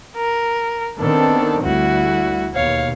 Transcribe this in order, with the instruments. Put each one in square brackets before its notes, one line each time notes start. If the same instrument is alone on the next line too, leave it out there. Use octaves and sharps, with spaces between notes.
[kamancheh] A#4
[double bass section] D#3 B3 C4 [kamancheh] D4 A4
[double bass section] D2 G3 [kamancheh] E4 F#4
[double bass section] D#2 B2 [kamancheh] C#5 F5